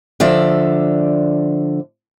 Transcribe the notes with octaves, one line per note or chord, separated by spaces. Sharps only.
D3 F3 D5 E5